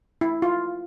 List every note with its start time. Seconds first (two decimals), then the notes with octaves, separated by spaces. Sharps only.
0.21 E4
0.42 F4